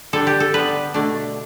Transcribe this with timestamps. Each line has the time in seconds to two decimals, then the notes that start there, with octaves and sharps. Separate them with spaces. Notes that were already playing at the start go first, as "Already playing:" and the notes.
0.13 D3 G3 D4 A4
0.27 G4
0.40 A4
0.54 D3 G3 B3 B4
0.94 B2 A3 D4